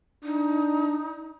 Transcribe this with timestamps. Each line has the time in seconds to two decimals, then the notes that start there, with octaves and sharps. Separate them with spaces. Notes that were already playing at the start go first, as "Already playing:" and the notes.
0.24 D4 D#4